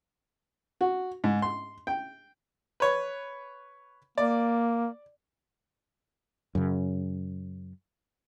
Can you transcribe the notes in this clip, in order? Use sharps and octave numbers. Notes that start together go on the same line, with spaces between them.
F#4
G#2
C6
G5
B4 C#5
A#3 D5
F#2 C#3